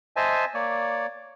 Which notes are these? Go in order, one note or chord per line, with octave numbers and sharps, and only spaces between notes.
C5 D#5 E5 G#5 A5
A#3 C#5 D5